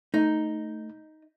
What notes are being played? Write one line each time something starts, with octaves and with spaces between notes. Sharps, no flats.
A3 D#4